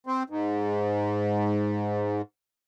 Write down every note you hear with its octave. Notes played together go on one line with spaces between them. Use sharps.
C4
G#2